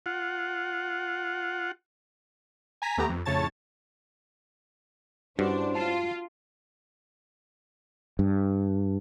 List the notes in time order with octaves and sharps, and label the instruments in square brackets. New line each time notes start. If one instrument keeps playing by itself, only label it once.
[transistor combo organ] F4 F#5
[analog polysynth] G#5 A#5 B6
D#2 A3 B3 G4 A#5
F2
F2 A2 C#3 C#5 A5 A6
[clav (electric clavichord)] G2 [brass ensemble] C#4 E4 C5 [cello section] D4 [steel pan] F#4
[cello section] F4 [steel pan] A5
[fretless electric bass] G2